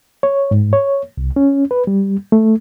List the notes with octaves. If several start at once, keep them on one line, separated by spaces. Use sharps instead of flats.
C#5
G#2
C#5
C2
C#4
B4
G3
A3